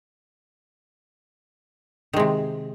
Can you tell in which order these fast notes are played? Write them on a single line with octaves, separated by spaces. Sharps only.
D#3 G#3 C3